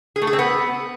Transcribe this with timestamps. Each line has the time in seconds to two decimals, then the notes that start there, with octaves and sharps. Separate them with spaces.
0.16 G#4
0.22 A3
0.27 G#4
0.33 C4
0.39 B3